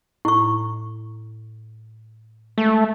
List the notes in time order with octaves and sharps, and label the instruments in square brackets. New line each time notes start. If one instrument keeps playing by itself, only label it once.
[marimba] A2 [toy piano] E4 C#6
[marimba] G#3 [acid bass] A3